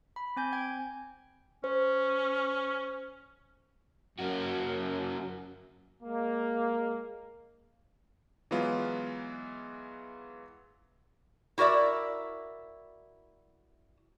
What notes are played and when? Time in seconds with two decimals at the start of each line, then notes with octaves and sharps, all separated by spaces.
0.16 B5
0.37 C4 G#5 G6
0.53 G5 G#6
1.64 C#4 C5
4.19 F#2 A#3 C#4 F#4
6.02 G#3 A#3
8.51 E3 F#3 G#3 B3 F4
11.58 E4 F#4 A#4 D5 E5